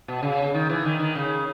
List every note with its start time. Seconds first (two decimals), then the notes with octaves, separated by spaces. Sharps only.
0.08 B2
0.22 C#3
0.54 D#3
0.69 E3
0.85 D#3
0.99 D#3
1.15 C#3